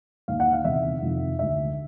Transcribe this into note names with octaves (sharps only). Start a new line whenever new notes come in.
D#2 D#3 F5
F#5
F5
E2 C3 D#3 E5
F2 C3 D#3
D2 D3 E5